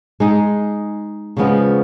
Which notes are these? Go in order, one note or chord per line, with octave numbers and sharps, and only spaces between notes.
G#3 D#4 G#4
C#3 F3 G#3 B3 F4